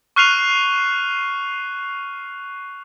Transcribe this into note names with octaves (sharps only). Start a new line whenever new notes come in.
C#6 F6 F#6 C7 D#7 F7